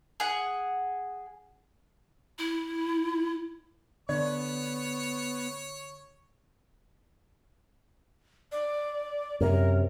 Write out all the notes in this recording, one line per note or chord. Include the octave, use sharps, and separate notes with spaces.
G#4 F#5
E4
D3 B3 C#5 D5
D5
F#2 C3 A#4